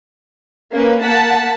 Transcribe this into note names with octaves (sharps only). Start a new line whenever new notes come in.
A#3 C#4 B4
A#3 F#5 A5 B6